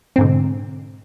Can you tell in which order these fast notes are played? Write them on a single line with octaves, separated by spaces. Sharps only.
C4 G#2 D3 B2